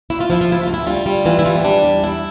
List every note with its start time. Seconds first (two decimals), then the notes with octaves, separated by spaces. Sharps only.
0.10 D2 E4
0.20 F4
0.30 F3 E4
0.41 F4
0.49 D2 E4
0.63 D2 F4
0.74 E4
0.87 G3 F4
1.06 G3
1.26 E3 F4
1.39 E4
1.45 G3 F4
1.55 B3
1.61 C4
1.64 G3 D4
1.84 E2
2.03 E2 E4